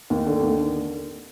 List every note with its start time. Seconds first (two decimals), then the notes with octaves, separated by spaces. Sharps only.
0.10 D#2
0.26 D3
0.42 D#2